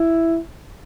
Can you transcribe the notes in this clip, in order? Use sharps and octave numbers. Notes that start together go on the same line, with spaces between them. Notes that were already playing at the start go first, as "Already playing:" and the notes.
Already playing: E4